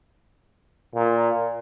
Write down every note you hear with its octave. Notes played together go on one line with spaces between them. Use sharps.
A#2